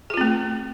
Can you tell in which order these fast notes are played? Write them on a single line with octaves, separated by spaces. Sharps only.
G#4 F4 C4 A3